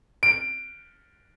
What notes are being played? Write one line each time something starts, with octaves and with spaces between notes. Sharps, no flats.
D7